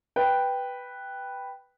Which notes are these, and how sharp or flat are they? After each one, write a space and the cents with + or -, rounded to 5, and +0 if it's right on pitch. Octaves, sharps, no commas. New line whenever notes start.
B4 +0 G5 +0